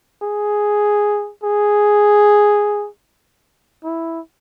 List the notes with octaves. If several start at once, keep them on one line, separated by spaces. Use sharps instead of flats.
G#4
G#4
E4